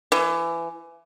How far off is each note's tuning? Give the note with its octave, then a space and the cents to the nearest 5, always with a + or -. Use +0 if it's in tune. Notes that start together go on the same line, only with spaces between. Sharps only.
E3 +25